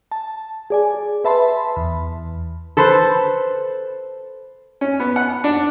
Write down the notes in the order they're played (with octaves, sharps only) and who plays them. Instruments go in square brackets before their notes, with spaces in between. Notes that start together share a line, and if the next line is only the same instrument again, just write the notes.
[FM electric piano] A5
G#4 D5 G#5
B4 E5 A5 B5 C6
E2
[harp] A4 B4 C5
[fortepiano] C#4
B3
F#5
D4